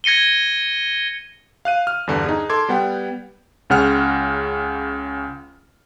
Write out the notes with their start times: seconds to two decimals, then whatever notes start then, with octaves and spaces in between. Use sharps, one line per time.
0.04 G#6 A#6 C#7 D#7 G7
1.65 F5 F#6 D#7
1.87 F6
2.07 E2 G2 D3
2.26 D#4 G#4
2.50 A4 C6 D6 G#6
2.69 G3 B3 F#5 G5
3.70 C#2 C#3 F#5 F6